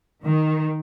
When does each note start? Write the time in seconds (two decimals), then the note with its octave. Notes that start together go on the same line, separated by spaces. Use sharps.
0.24 D#3